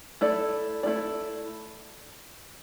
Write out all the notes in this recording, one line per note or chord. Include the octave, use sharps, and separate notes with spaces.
A3 E4 A4 D5
A3 E4 A4 D5